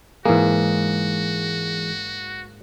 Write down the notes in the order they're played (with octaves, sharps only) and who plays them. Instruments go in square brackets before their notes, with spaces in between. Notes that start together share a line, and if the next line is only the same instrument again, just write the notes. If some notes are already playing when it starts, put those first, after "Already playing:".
[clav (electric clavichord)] G#2 A#3 [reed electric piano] E3 G#3 G#4 [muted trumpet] F#4